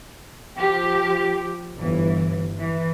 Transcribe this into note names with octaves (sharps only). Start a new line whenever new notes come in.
F3 G4
G1 E3
E3